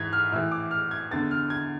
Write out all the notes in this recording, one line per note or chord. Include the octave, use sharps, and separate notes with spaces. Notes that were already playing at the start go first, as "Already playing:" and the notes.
Already playing: G#2 E3 G#6
F6
A2 E3 E6
D6
F6
G#6
E2 D3 A6
F6
G#6